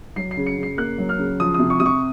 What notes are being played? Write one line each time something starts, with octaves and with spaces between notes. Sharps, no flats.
F#3 C7
C7
C#3
C#7
C#3
C7
A#3 F#6
F#3
F6
C#3
F3 D#6
C3 D#6
C#6
C3 D#6
C#6